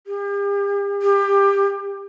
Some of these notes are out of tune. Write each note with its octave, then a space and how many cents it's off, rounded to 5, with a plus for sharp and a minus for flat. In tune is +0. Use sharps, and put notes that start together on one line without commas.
G4 +45
G4 +25